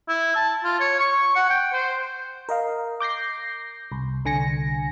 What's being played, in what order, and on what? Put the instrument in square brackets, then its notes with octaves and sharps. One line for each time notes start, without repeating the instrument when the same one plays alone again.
[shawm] E4
A5
F4
C#5
C#6
F#5
G5
C5
[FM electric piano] A#4 D#5 F5
D6 G6 A#6 C7
C2
C2 D3 G#5 A#6 C#7